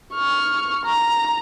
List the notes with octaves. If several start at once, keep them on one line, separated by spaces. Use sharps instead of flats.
C#6 F6
A#5